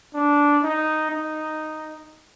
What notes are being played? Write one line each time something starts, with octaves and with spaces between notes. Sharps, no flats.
D4
D#4
D#4